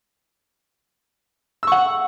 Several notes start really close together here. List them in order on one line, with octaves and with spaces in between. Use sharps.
E6 C#6 F#5